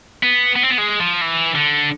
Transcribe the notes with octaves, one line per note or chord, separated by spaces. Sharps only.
B3
B3
C4
B3
G#3
F3
E3
D3